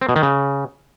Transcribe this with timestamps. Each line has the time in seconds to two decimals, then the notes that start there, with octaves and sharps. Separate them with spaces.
0.01 C4
0.09 B2
0.16 D#3
0.23 C#3